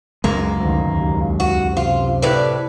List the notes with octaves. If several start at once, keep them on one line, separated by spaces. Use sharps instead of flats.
C#2 F#2 G#3 A#3
D2 D#3
D#2
F#4
C3 F4
A2 B4 D5